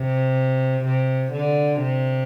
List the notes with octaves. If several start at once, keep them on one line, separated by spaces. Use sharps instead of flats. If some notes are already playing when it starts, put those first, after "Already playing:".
Already playing: C3
C3
D3
C3